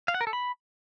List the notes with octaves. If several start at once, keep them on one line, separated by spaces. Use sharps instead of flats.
F5
F#5
A#4
A4
B5